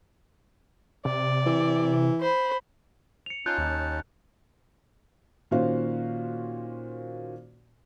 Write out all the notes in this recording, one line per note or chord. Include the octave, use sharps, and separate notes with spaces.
C3 D5
E3
C5 B5
C#7 F7
C#4 D#4 F4 A5 F#6 G6
D#2
A#2 D#3 C#4 F#4 C5 F5